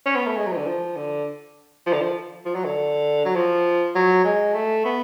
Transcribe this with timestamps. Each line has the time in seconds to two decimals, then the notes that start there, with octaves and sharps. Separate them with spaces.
0.06 C#4
0.16 B3
0.27 A3
0.36 G#3
0.46 F#3
0.52 F3
0.57 D3
0.67 F3
0.97 D3
1.86 F3
1.93 D3
2.02 F3
2.45 F3
2.55 F#3
2.65 D3
3.25 F#3
3.36 F3
3.95 F#3
4.24 G#3
4.54 A3
4.85 B3